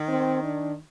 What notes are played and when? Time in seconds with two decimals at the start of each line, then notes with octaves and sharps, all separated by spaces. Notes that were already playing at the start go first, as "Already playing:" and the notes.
Already playing: D#3
0.09 C4
0.43 D4